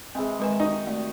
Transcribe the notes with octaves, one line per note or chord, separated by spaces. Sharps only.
C3 E3 G#3 C4 G#4
D#3 G#3 B4 G#5
D#4 F#4 G4
A3 D5